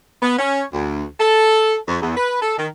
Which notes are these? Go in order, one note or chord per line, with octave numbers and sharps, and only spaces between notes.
B3
C#4
D2
A4
F2
E2
B4
A4
D#3